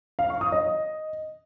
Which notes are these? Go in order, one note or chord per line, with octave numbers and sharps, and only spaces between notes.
F5
C#6
D#6
D#5